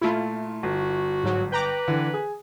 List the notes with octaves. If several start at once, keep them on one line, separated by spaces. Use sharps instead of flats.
A#2 A3 E4 F4
G1 F#4
G#2 F#3
B4 G5 A#5 D6
D3 E3
G#4